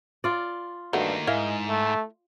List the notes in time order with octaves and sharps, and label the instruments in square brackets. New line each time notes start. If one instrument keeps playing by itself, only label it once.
[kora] F4 D5
[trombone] G2 [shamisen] A3 F#4 [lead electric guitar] A#3 D#4
[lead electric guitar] G#2 [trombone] G#3 [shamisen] E4 A#4 F5
[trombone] A3